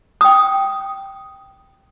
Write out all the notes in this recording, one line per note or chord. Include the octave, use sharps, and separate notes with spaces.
G5 D#6